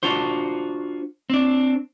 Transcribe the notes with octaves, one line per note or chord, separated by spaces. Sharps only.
D4 F4 F#4 C5
C4 D4